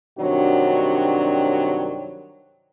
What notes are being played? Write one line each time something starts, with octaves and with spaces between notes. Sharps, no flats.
G2 C3 D#3 F#3 D4 F#4